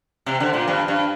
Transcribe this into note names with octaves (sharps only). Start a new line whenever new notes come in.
C3
D3
A#2
G2
G2